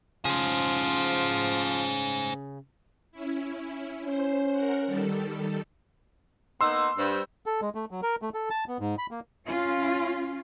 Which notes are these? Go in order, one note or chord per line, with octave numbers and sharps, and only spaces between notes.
C#3 F3 G#4 C5
C#4 E4
C#4 C5
A#4 F#5
D#3 G3 A4
A#3 B3 D#4 C6 E6
G2 C5
A4
G#3
A3
F#3
A#4
A3
A4
A5
B3
G#2
B5
A#3
C#4 F4